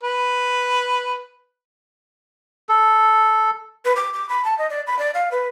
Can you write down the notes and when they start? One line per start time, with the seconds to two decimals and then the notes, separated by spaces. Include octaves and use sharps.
0.03 B4
2.69 A4
3.85 B4
3.96 D6
4.13 D6
4.29 B5
4.45 A5
4.58 D#5
4.70 D5
4.87 B5
4.99 D5
5.15 F5
5.31 B4